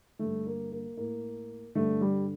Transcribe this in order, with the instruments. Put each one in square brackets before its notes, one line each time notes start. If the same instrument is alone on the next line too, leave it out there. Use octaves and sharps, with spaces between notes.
[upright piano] G2 D3 A3
A#3
A#3
A2 A#3
G2 D3 A3
G3